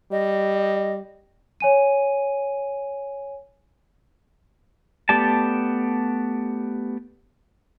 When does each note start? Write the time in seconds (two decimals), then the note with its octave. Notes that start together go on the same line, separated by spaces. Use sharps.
0.12 G3 D#5
1.60 C#5 G#5 D#7
5.09 A3 B3 G4 D5 A5